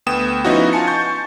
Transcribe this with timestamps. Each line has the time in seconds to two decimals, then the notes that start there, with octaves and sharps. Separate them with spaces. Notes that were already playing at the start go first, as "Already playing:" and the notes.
0.06 D2 B3 G5 D#6 E7
0.45 F3 B3 C#4 D#4 E4 F#4
0.73 F4 G#5 A5 C#7
0.87 C#6 G6 A6